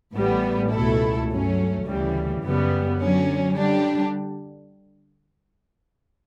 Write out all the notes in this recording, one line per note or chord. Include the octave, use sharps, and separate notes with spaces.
A1 A2 G3 B3
C#2 B2 A3 E4 A4
G2 F#3 A3 C#4
D2 C#3 E3 G3
F#2 C#3 G3 B3
D3 F#3 C#4
D3 G3 D4 G4